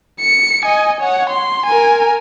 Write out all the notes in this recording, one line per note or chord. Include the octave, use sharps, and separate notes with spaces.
C#7
D#5 G#5
C#5 F#5
C6
A#4 G#5